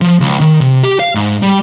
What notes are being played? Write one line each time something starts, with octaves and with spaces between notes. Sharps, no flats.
F3
C#2
D#3
C3
G4
F5
G#2
G3